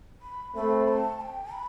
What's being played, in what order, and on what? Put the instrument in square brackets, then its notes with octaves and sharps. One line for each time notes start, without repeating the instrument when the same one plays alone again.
[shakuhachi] B5
[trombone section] A3 C4 [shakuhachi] B5
[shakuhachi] A5
G5
B5